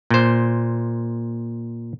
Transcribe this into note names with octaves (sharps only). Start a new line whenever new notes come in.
A#2 C5